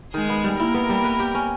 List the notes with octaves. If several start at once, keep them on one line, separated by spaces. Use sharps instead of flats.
D#3 G#3 G#4
B3
G3
A#3 E4 A#4
B3
G3
B4
G4
C#4